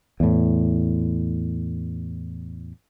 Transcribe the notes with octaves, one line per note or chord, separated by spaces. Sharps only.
E2 A2